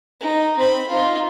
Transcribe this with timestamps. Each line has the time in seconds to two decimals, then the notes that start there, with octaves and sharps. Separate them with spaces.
0.21 D#4
0.58 C4 B5
0.88 D#4 F4